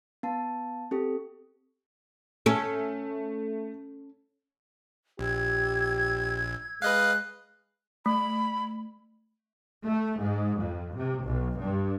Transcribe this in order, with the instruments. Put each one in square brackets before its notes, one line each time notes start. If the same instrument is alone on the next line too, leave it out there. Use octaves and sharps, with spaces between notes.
[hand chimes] B3 A5
C4 G4 A4
[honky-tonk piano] A3 [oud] C#4 A4
[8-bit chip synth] A#1 [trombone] G4 [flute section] E6 G#6
[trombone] G#3 [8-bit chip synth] B4 D#5 F5 [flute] F#6
[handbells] A3 [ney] B5
[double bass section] A3
G#2
F2
C3
B1
G2